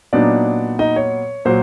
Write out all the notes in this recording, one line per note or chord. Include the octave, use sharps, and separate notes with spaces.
A#2 F#3 B3 D4 D#4 D5
D#4 D#5
C#5
A#2 F#3 C5